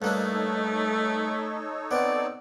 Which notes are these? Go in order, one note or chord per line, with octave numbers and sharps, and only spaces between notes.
G2 A3 A#3 D4 D#4 A4 C#5
B3 C4 D5